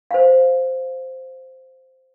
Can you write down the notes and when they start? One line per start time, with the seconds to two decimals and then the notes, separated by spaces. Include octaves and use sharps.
0.11 C5 F5